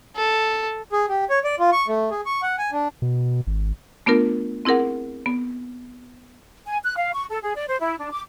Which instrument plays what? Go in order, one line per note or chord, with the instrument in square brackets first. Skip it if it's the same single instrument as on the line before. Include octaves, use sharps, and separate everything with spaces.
[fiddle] A4
[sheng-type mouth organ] G#4
G4
C#5
D5
F4
C#6
A3
G#4
C#6
F#5
G#5
D4
[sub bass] B2
G#1
[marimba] A3 B3 D4 F4 A#4
C4 E4 G#4 A#4 F#5
B3
[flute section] G#5
F#6
F5
C#6
A4
G#4
D5
C5
E4
D4
D6